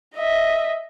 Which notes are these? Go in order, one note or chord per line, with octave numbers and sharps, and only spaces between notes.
D#5 E5